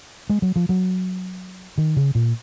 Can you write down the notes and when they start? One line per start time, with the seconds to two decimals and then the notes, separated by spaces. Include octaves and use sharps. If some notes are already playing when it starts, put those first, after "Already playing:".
0.30 G#3
0.42 F#3
0.56 F3
0.69 F#3
1.78 D#3
1.97 C#3
2.15 A#2